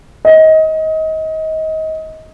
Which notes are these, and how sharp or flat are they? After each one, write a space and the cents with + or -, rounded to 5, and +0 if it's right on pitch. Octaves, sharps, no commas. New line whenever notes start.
D#5 +25